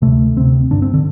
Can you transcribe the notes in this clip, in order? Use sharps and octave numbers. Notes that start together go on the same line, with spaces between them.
D2 C3 A3
D2 C3 C4
G1 G2 D3 D4
C4
D3